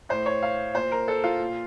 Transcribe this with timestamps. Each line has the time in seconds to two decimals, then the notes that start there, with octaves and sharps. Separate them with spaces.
0.09 A2 C5
0.26 C#5
0.43 F5
0.74 A#2 C5
0.92 A#4
1.08 A4
1.24 F4
1.40 A#2